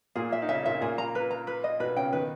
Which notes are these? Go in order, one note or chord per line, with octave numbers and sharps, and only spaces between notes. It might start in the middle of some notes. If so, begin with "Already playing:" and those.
A#2 A#3 G#4
E5
D#4
C#3 C#4 E5
A#2 A#3 E5
A#2 A#3 G#4
A#5
B4
A#5
B4
D#5
B2 B3 B4
C#3 C#4 G5
D#3 D#4 B4